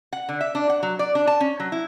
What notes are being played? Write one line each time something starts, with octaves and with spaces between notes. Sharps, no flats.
F#5
D3
E5
D4
F#5
F#3
D5
D4
A5
C#4
F#3
E4